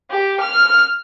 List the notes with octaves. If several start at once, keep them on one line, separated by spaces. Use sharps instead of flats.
G4
F6